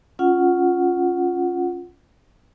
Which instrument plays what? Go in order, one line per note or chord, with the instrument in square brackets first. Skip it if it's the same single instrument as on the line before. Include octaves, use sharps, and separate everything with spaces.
[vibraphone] C#4 F4 F#5